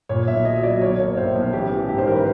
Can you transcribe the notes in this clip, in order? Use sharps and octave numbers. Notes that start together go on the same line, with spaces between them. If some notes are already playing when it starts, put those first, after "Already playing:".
A#2 C#5
B1 E5
F#3 D#5
F#3 D5
B1 C#5
A#3 C#5
A2 C5
B1
A1 G4
E3
G#2 G4
C5
A1 A#4
B4